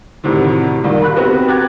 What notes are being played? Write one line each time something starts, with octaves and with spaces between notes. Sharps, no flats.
D2 A2 C3 D#3
C2 A#2 D#3 A#3
B5 F#6
B3 C4 F#4 G4 B4
G5 A#5 D6 F#6 G#6 A6